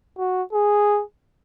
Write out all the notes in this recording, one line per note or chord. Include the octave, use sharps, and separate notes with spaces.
F#4
G#4